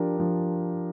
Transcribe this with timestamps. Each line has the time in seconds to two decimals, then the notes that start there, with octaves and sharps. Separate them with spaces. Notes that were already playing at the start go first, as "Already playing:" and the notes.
Already playing: F3 D4 G4 A#4
0.17 F3 D4